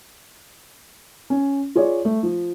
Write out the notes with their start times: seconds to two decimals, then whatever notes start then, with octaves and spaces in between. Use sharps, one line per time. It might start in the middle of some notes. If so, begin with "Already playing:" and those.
1.30 C#4
1.76 F4 G#4 C#5 D5
2.05 A3
2.23 F3